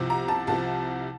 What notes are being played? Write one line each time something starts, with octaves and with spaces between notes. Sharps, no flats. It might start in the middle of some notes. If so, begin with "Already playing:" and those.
Already playing: C2 C3 F3
A#5
A5
C2 C3 F3 A5